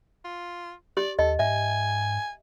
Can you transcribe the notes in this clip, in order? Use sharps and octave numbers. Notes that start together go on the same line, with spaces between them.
F4
G4 D5
D#2 A4 D#5
G#2 E5 G#5